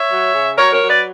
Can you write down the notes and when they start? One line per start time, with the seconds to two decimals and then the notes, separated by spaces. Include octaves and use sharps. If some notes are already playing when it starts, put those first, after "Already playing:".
Already playing: C#5 E5
0.10 F#3
0.34 C#3
0.58 F#3 A#4 C#5
0.73 A#4 C#5
0.82 F#3
0.89 B4 D5